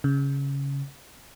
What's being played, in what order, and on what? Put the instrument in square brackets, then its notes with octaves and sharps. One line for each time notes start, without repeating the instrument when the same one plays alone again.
[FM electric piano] C#3